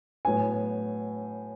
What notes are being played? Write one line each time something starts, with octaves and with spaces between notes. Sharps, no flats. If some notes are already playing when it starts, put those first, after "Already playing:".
A2 F#3 B3 G#5